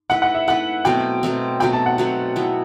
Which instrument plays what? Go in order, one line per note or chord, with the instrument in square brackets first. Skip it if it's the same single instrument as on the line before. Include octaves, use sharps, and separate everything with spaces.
[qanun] A3 E4 B4 [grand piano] F#5
[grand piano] F#5
E5
[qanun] A3 E4 B4 [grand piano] F#5
[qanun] B2 F#3 A3 C4 [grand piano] G5
[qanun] B2 F#3 A3 C4
[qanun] B2 F#3 A3 C4 [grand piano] G5
[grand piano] A5
F#5
[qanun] B2 F#3 A3 C4
F#3 B3 E4